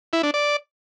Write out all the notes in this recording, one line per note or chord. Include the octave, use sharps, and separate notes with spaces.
E4
D4
D5